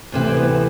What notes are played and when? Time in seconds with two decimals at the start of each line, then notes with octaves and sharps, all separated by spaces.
0.12 D2 C3 E3
0.26 C4
0.36 B3